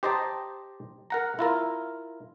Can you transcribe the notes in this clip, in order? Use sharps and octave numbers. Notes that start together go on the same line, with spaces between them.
G4 C5 D#5 G5 A5 A#5
A#4 F#5 A#5
E4 F4 A#4